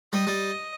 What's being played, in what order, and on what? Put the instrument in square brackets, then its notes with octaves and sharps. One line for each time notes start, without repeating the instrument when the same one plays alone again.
[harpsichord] G3 [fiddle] D#5
[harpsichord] G3